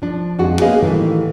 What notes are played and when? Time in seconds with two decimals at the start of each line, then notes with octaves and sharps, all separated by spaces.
0.02 F3 D4
0.39 F2 G#3 F#4
0.61 A#3 B3 C#4 G#4 D#5 F5
0.83 A2 D#3 E3 G3 A3 E4